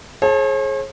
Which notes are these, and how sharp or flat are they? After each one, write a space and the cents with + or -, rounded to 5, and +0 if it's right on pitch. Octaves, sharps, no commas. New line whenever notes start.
G#4 +30 C#5 -45 A5 -10